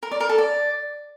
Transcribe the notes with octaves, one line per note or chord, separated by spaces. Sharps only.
A#4
D5
A#4
A4
D5